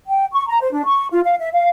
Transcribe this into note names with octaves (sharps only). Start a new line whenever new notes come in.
G5
C#6
A#5
C5
D4
C#6
F4
F5
E5
F5